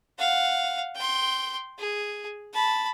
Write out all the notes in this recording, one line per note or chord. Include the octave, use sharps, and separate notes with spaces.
F5 F#5
G5 C6
G#4
A5 B5